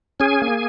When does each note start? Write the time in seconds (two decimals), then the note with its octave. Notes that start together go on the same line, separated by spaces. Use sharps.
0.20 C#4 G#4 G#5
0.42 A#3